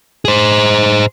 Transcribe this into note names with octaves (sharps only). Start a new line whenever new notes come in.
G#4 C5